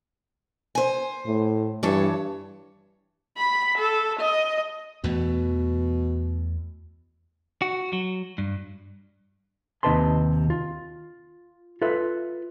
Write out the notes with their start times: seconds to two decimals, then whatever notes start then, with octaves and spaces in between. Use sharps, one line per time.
0.75 C5 G#5
1.26 A2
1.83 G2 E3 C#5 A5
3.37 B5
3.78 A4
4.20 D#5
5.04 E2 B2 E3 A3
7.62 F#4
7.93 F#3
8.38 G2
9.83 D#2 C3 D#4 B4 A5 C6
10.50 F4
11.82 F4 A4 B4 E5